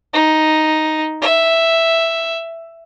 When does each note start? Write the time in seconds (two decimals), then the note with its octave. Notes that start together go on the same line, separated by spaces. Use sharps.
0.13 D#4
1.22 E5